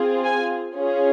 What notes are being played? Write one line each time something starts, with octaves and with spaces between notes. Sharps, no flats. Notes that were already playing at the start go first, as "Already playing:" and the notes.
Already playing: C4 F4 G#4
G#5
C#4 F4 G#4